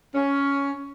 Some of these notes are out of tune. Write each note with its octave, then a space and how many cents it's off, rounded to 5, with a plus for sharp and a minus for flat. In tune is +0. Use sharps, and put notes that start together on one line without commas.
C#4 +10